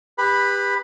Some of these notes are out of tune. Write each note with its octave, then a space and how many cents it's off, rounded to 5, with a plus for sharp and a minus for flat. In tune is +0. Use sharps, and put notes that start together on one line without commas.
G4 +30 B4 +0 B5 +0